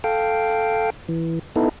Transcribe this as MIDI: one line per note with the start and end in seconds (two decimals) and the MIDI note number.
0.04 0.90 69
0.04 0.90 77
0.04 0.90 79
1.09 1.39 52
1.56 1.69 59
1.56 1.69 63
1.56 1.69 64
1.56 1.69 69